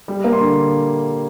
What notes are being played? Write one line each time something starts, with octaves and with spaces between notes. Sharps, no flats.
G3
A#3
C6
D3